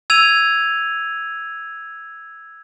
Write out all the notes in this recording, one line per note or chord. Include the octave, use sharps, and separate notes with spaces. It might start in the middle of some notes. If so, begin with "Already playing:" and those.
E6 G#6 D#7 F7